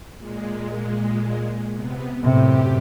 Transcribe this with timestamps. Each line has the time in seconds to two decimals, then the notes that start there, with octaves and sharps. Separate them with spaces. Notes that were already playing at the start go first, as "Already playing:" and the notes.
0.17 A#2 G#3
1.74 C3 B3
2.23 F#2 A2 C3 G4